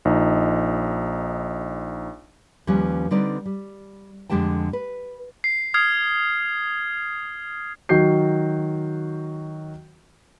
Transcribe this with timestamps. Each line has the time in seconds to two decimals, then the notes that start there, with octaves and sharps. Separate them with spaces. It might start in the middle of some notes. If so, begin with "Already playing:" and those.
0.05 A#1 D#4 D#5
2.67 D#2 F3 G3 C#4 B4
3.11 D3 G3 C4 D#4 B4 D5
3.46 G3
4.30 F2 D3 G#3 G4 G5 A5
4.73 B4
5.44 C7
5.74 D#6 F6 G#6 C7
7.89 D#3 F#3 F#4 G6 C7